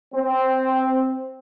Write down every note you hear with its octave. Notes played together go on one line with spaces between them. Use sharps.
C4